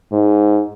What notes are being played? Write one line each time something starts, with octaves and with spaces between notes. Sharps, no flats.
G#2